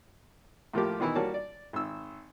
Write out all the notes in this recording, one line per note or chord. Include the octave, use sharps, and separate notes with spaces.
A2 F3 A#3 G4
B2 D#3 E3 E4
G3 A#3 F#4 C#5 A5
D5
G#1 E6